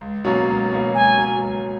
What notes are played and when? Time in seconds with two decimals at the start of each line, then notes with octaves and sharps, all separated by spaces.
0.01 C#2
0.24 B2 F#3 A#3 C#4
0.48 C#2
0.71 B2 F#3 A#3 C#4
0.95 C#2 G#5
1.17 B2 F#3 A#3 C#4
1.42 C#2